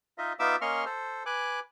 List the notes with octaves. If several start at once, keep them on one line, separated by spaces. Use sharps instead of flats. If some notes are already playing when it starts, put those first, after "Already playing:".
D#4 F4 D#5 E5
B3 D#4 F4 E5 D6 E6
A#3 C#4 D#5 C6 C#6 F6
A4 C5
B4 G#5 D6 F#6